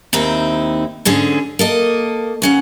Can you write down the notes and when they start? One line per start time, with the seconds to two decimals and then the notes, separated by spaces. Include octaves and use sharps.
0.13 D#2 C4 D#4 E4
1.05 G#2 D3 C#4 G#4
1.59 A#3 A4 D#5
2.42 D#2 C#4 F#5